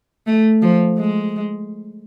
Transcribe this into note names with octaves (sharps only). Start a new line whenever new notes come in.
A3
F3
G#3